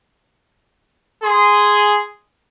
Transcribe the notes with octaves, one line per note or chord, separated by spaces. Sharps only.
G#4 C6